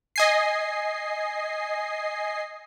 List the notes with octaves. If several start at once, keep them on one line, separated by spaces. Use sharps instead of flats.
D#5 G#5 C7